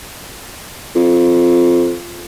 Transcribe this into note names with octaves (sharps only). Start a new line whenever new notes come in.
F2